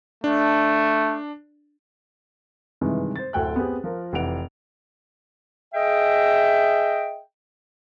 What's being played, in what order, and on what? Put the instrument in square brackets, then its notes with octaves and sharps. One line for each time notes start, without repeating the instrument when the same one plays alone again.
[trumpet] A3 [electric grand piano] D4
[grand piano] G2 C3 D#3 E3 G#3
C5 A6
D1 D2 A4 G5 G#5 F#6
B3 C4 G4 G#4
F3 F4 A#4
F1 E3 D#5 F#5 D7 F7
[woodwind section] G#4 D#5 E5 G5